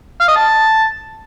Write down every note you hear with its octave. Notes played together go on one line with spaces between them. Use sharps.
F5
D#5
A5